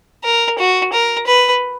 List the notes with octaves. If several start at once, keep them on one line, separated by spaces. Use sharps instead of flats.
A#4
F#4
A#4
B4